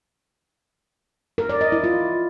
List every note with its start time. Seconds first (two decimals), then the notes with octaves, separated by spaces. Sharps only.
1.38 A#4
1.49 D5
1.61 D#5
1.72 E4
1.84 F4